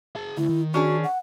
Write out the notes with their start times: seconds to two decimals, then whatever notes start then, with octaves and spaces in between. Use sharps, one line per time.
0.16 G#4 A5
0.37 D2 E4
0.50 D#3
0.74 C#4 D4 F#4 G#4
1.04 F#5